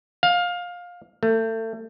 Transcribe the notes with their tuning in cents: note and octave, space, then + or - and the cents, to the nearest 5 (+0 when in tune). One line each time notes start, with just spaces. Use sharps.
F5 +20
A3 +30